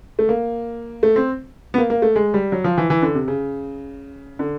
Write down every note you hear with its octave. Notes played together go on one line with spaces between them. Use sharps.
A3
A#3
A3
C4
B3
A#3
A#3
A3
G#3
G3
F#3
F3
E3
E3
D3
C3
C#3
D3